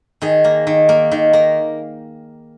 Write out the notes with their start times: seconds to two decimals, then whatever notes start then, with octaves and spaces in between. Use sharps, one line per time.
0.22 D#3 G#4
0.44 A#3
0.67 D#3
0.89 A#3
1.11 D#3
1.33 A#3